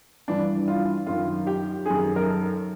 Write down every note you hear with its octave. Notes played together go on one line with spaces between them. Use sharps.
G2 E3 D4
F4
F#2 D#3 F4
G4
F#2 D#3 G#4
A#4
A4